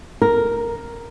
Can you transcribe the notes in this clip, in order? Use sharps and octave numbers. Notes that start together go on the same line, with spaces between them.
A#4